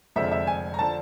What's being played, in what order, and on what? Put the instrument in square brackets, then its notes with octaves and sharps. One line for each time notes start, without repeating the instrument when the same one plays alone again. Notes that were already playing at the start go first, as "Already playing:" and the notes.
[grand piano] F1 F2 D3 F3 G#3 [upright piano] E5
[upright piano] E5
G#5
A#5
[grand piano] D3 F3 [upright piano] A5